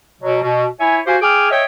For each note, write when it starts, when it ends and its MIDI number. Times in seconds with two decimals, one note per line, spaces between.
0.21 0.40 47
0.21 0.40 54
0.42 0.65 47
0.80 0.99 64
0.80 0.99 73
0.80 0.99 76
0.80 0.99 80
1.06 1.15 66
1.06 1.15 67
1.06 1.15 72
1.06 1.15 77
1.06 1.15 80
1.22 1.47 68
1.22 1.47 79
1.22 1.47 80
1.22 1.47 86
1.22 1.47 89
1.51 1.64 73
1.51 1.64 75
1.51 1.64 76
1.51 1.64 79